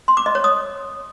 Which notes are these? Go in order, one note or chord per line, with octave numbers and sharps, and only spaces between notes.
C6
D6
D#5
C#5
D#6